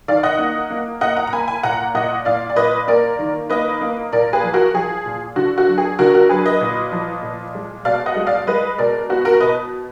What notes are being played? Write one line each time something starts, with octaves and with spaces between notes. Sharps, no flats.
D#3 D5 F5
D#5 F#5
A#3
A#3
A#3 D#5 F#5
F#5 A#5
A#5
A#3 G#5 B5
G#5 B5
A#2 F#5 A#5
A#2 D#5 F#5
A#2 D5 F5
D5
A#2 B4 D#5
A#3 A#4 D5
D#3
A#3 B4 D#5
A#3
A#2 A#4 D5
G#4 B4
F3
F#4 A#4
F3 G#4
A#2
D3 F#4
F#4
F#3
G#4
D3 F#4 A#4
F#4 A#4
F#3 G#4 B4
B4 D#5
A#2
F3
A#2
G#3
B2 D5 F5
D#5 F#5
G#3
D5 F5
G#3 B4 D#5
B2 A#4 D5
B3 F#4
F#4 A#4
B2 B4 D#5